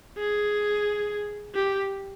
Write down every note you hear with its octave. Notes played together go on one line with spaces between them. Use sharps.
G#4
G4